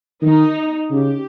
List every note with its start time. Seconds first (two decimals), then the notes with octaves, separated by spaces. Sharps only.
0.22 D#3 D#4
0.90 C#3 G4